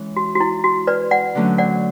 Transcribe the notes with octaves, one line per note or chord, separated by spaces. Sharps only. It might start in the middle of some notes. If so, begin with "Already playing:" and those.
Already playing: E3 G#3 C#4
F#4
F#4
E4
F#4
B4 D5
D5 F#5
D3 F#3 A3 C#4
D5 F#5